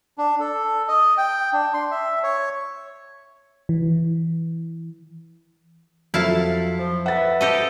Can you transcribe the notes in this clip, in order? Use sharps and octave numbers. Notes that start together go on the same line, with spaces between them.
D4
A4
D#5
G5
D4
C6
E5
C#5
E3
F2 F#3 E4 A4 F5 A5
F3
F2 B4 E5 F#5 A6
G4 A4 D#5